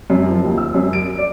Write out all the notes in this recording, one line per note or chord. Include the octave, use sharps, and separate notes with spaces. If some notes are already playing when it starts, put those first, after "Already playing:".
F#2
F3
D#2
E6
F#2
D7
D5